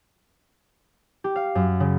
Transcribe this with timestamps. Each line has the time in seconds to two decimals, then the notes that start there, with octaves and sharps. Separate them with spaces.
1.24 G4
1.36 F5
1.55 F#2
1.80 C#3